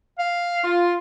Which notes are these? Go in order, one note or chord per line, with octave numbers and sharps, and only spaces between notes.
F5
F4